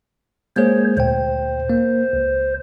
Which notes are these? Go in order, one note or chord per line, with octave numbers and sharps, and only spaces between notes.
G#3 A#3 G#4 C5 C#5
D2 A#2 C5 G5
A#3
C#2